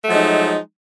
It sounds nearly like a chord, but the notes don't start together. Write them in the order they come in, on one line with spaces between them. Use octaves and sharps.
A3 F#3 F3 G#3 D#4